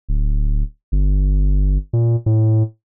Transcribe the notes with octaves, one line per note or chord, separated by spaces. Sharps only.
D1
G1
A#2
A2